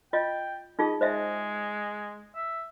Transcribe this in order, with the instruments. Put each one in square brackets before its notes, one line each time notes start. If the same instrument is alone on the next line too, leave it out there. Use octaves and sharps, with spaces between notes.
[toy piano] F4 D#5 [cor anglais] G5
[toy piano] D#4 F4 G#4 [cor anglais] D#5
[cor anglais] G#3 [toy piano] C5 D#5 E5
[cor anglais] E5